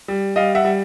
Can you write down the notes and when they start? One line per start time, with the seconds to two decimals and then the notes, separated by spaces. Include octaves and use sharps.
0.08 G3
0.36 G3 D#5 F5
0.55 E5 F#5
0.65 G3